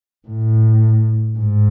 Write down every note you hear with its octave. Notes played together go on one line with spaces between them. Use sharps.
A2
G#2